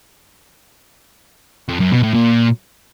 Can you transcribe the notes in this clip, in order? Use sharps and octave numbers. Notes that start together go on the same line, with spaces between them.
F2
F#2
B2
A2
A#2